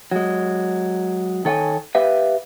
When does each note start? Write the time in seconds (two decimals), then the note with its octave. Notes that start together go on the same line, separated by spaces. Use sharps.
0.11 F#3 G#3
1.45 D#3 A4 C#5 F#5 G#5
1.95 G4 B4 E5 F5